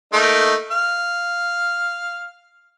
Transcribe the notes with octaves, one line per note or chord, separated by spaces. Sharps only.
A3 A#3 D#4
F5